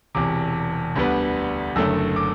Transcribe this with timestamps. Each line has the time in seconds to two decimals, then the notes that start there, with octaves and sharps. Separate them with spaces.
0.15 E1 E2 C3 D6
0.96 D2 D3 G3 B3
1.76 F#1 F#2 D3 A3 E6
2.16 D6